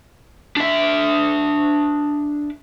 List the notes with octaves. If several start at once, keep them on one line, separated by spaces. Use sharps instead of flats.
D4 E5